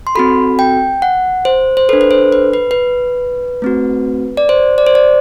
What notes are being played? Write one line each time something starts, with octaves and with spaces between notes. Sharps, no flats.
C6
C4 F#4 A4 B5
G5
F#5
C5
C5
D4 A4 B4
B4
C5
B4
B4
B4
A3 C4 F#4
D5
C5
D5
C5
D5